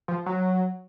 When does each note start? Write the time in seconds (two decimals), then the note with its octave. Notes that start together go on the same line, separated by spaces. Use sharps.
0.08 F3
0.26 F#3